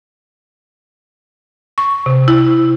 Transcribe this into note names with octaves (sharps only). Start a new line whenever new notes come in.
C#6
C3
E4